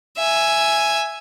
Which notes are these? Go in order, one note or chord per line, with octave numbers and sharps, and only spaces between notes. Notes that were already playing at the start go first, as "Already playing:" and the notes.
E5 G#5